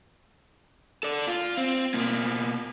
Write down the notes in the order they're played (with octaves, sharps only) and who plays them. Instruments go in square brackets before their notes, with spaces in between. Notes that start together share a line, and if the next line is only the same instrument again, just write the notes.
[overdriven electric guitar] A4 D5
F4
C4
B2 A#3